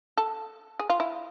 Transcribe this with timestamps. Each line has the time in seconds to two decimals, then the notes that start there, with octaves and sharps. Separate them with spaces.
0.17 A4
0.79 G#4
0.90 F4
1.00 E4